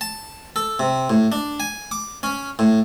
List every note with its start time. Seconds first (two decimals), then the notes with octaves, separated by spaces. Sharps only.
0.01 A5
0.56 A4
0.79 C3
1.10 A2
1.32 D4
1.60 G#5
1.91 D6
2.23 C#4
2.59 A2